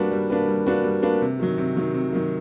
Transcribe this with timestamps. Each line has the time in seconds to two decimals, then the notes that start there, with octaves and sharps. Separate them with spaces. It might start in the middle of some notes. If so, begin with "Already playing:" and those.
Already playing: G3 A#3 D4 F#4 B4
0.11 G3
0.30 A#3 D4 F#4 B4
0.48 G3
0.67 A#3 D4 F#4 B4
0.84 G3
1.02 A#3 D4 F#4 B4
1.21 C3
1.40 D#3 F#3
1.58 C3
1.77 D#3 F#3
1.94 C3
2.13 D#3 F#3